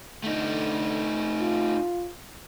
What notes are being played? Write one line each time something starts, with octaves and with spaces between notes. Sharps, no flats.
D3 A3 D#4
F4